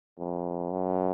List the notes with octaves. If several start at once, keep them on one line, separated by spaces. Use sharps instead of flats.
F2
F#2